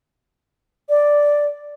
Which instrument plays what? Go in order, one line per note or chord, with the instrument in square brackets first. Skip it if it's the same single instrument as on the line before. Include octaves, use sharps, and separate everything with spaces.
[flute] D5